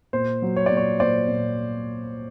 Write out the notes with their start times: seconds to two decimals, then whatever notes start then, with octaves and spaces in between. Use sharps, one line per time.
0.13 A#2 C5
0.42 F#3
0.56 C#5
0.66 A#2 D5
0.77 C#5
1.00 A#2 C5 D5
1.28 A#2